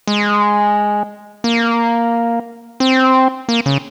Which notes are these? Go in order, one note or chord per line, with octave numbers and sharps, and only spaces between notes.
G#3
A#3
C4
A#3
C#3